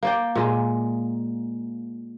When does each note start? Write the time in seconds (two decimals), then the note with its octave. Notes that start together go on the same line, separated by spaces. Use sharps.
0.03 A#3 D5 G5
0.35 A#2 G#3